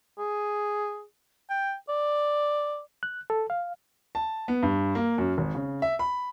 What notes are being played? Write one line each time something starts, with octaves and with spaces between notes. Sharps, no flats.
G#4
G5
D5
F#6
A4
F5
A5
B3
G2
A#3
F#2
G#1
C#3
E5
B5